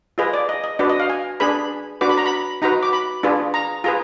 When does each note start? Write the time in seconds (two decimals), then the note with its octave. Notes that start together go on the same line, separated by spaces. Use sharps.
0.18 F4 G#4 B4 D#5
0.33 D5
0.49 D#5
0.64 D#5
0.79 D4 F#4 B4 D5
0.90 D#5
1.00 F5
1.10 G#5
1.40 D4 G#4 B4 B5
2.01 D4 F#4 B4 D6
2.09 B5
2.18 A#5
2.26 B5
2.62 D#4 F#4 B4 A#5
2.83 D6
2.93 B5
3.23 D4 F4 G#4 B4
3.54 A#5
3.84 F4 G#4 B4 A#5